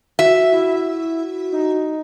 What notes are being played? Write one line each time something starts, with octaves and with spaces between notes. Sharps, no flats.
F#4 E5
E4
D#4